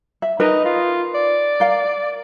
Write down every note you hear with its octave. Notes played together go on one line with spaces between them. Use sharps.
E5
D#4 A#4 B4 G#5
F4
D5
A#4 F5